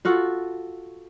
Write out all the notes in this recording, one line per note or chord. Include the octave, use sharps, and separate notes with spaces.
F4 F#4 A4